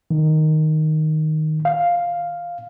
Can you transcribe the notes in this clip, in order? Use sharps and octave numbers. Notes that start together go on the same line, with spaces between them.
D#3
F5